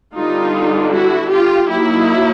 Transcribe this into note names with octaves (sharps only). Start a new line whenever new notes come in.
D3 G3 B3 D4 D#4 F4
E4 F#4
F4 G4
F#3 A#3 D#4 E4